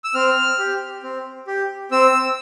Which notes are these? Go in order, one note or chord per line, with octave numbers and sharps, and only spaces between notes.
E6
C4 F6
G4
C4
G4
C4 E6